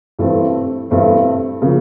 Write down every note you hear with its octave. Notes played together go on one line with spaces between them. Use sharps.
G2 E3 A3 C4
G2 E3 A3 C4
C#3 F3 A#3